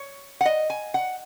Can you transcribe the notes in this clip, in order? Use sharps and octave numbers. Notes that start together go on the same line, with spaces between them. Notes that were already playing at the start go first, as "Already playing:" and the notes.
Already playing: C#5
F#5
D#5
G#5
F#5